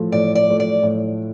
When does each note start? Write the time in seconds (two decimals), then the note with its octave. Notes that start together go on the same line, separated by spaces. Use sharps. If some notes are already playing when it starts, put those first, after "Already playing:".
Already playing: A2 F3 A3
0.12 A2 D5
0.35 D5
0.48 F3 A3
0.60 D5
0.83 A2